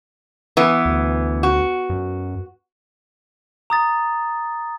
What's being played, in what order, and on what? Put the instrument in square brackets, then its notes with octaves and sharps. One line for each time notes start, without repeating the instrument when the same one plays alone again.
[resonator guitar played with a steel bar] E3 B3
[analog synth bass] D2
[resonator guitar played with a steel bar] F#4
[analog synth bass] F#2
[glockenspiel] A#5 D#6 A6